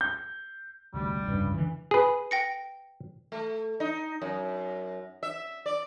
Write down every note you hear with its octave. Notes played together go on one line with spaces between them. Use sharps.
G6
F1 D2 B2 G3
F1 C#2 G2 C#3
D3 E3
G#4 B4
G5 A#6 C#7
A3
D#4
F#2
E5
D5